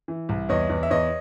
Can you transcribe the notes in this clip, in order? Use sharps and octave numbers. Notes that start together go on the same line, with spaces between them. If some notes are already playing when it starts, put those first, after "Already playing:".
E3
C2
E2 C#5 D#5
E2
E5
E2 C#5 D#5